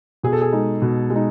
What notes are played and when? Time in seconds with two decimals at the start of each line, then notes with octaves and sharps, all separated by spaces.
0.23 B2 G#4
0.33 A4
0.41 G#4
0.53 G#3 D#4
0.82 B2
1.10 G#3
1.16 D#4